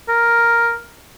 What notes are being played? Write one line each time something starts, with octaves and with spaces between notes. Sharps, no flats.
A#4